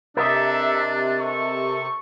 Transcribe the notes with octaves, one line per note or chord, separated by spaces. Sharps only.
C3 D4 G4 A4 A#4 D#5 E5
A4 C#6